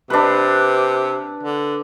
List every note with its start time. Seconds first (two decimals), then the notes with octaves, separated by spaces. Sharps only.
0.10 C3 D4 B4
1.43 D3